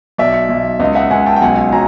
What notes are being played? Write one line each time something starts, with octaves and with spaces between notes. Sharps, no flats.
B1 D5 E5
B1
C#2 D#5 F5
E5 F#5
C#2 F#5 G#5
G5 A5
G5
B1 F#5 G#5
F#3 G#5 A#5